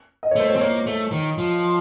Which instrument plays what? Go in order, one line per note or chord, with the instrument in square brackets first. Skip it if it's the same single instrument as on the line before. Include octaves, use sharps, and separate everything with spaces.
[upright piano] D#5
C#5
[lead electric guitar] A3 [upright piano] C5
[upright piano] C#5
[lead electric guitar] C4
[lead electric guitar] A#3 [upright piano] C#5
[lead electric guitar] A3
D#3
F3